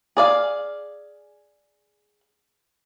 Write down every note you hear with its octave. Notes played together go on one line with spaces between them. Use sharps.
G#4 D5 F5